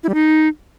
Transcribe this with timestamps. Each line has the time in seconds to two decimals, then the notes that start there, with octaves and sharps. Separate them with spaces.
0.03 E4
0.09 G3
0.14 D#4